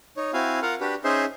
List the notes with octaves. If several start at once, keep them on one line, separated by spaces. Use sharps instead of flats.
D#4 C#5
C4 E4 F#4 F5 G#5
F4 A#4 F5 F#5
D4 F#4 G4 B4
C#4 D#4 G#4 C5 E5 C6